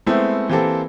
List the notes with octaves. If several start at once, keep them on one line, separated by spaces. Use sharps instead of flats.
G#3 A3 B3 C4 E4 E5
E3 A#3 C4 G4 A4 C5